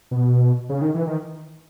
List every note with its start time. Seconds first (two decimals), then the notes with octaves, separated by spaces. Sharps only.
0.11 B2
0.69 C#3
0.81 D#3
0.94 E3
1.07 D#3